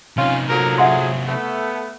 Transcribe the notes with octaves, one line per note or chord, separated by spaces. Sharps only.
C3 C#4 D#4 F4
D3 F3 F#3 A#4
G#4 E5 F#5 C6
A3 B3